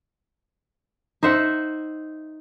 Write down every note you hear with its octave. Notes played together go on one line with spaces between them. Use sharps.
D#4 C5 E5 F#5